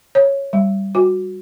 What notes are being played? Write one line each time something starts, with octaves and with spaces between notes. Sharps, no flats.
C#5
G3
F#4